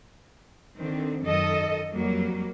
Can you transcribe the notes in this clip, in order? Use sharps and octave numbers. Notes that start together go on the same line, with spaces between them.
D3 D#3 C4
F#2 D#3 A4 D#5
F2 F#3 G3 A#3